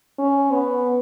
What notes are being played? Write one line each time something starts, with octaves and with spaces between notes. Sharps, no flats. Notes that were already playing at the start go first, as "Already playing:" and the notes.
C#4
B3